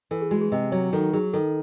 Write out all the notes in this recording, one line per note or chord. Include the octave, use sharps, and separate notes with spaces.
E3 A4
G#4
G#3 F#4
G#4
C3 D#5
F#3 C#5
D#3 A4
F#3 G#4
D#3 A4